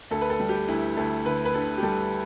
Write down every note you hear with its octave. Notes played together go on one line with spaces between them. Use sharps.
D2 A4
B4
A4
G3
G4
D2 E4
D2 A4
D3 B4
B4
D3 A4
G4
G3 A4